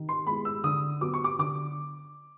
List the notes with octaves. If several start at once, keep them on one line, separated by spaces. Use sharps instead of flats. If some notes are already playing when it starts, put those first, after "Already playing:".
Already playing: D#3
C6
G#3 B3 E4 B5
E6
D3 D#6
F#3 B3 D6
C#6
D6
D3 D6